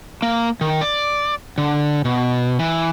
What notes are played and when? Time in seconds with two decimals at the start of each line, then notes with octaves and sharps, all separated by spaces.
0.22 A#3
0.61 D#3
0.81 D5
1.58 D3
2.05 B2
2.59 E3